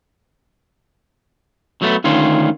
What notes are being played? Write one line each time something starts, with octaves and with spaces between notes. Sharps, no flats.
F#3 A3 B3
D2 D#3 C#4 F4